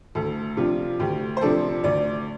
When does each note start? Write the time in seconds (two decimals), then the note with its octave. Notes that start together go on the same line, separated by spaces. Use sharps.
0.15 D2 A4
0.57 C3 F3 D4 F4
0.99 D2 G4
1.37 C5
1.41 C3 F3 D4 A4
1.84 D2 D5